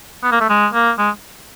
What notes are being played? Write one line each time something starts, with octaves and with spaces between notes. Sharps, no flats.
B3
A#3
A3
G#3
A#3
G#3